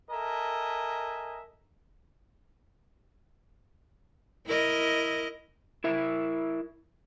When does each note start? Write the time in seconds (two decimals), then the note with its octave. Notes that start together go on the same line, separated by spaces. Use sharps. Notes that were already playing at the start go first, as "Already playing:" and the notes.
0.11 A4 A#4 D#5 E5 G#5
4.46 E4 A#4 D#5
5.84 E4 A#4 E5